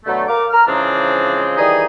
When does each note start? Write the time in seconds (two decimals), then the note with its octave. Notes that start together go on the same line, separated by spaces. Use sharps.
0.05 B2 D3 F#3 A3
0.28 A#4 F5 D6
0.50 A#5 F6
0.66 C#3 E3 F3 G#3 C4 D4
1.57 D#3 E3 G3 D#4 G#4